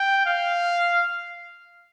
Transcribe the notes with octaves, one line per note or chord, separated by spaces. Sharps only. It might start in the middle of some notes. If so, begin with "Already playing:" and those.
Already playing: G5
F5